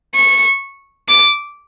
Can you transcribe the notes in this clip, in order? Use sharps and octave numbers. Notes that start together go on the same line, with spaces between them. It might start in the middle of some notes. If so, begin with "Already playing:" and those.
C#6
D6